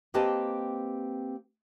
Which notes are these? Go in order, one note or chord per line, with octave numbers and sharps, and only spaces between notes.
A#3 C4 G4 B4 D#5 A5